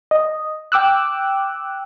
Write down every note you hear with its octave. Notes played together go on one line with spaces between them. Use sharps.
D#5
G5 D6 E6 F#6